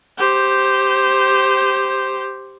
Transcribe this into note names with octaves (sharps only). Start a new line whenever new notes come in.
G4 C5